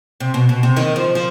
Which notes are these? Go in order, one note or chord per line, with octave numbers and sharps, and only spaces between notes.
C3
B2
B2
C3
D#3
F3
F3